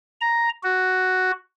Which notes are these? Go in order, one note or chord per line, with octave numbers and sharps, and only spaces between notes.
A#5
F#4